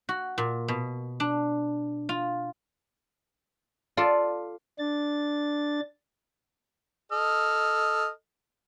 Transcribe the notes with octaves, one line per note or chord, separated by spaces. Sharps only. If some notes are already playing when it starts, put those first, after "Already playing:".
F#4
A#2
B2
D4
F4
F4 A4 D5
D4 A6
A4 D#5 F6